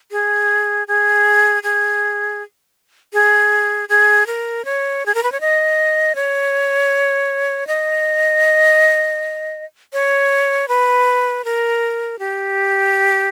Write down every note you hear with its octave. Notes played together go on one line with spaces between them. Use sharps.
G#4
G#4
G#4
G#4
G#4
A#4
C#5
G#4
A#4
B4
C#5
D#5
C#5
D#5
C#5
B4
A#4
G4